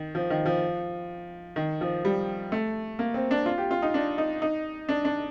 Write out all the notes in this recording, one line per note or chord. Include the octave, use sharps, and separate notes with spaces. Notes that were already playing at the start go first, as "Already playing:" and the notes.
Already playing: D#3
F3
D#3
F3
D#3
F3
G3
A3
A#3
C4
D4
F4
G4
F4
D#4
D4
D#4
D#4
D4
D4